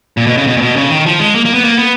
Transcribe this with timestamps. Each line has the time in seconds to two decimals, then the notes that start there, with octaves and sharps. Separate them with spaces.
0.17 A#2
0.27 B2
0.37 C#3
0.47 B2
0.57 A#2
0.61 B2
0.76 C#3
0.90 D#3
1.06 F3
1.20 G#3
1.35 A#3
1.45 A#3
1.54 B3
1.64 A#3
1.79 B3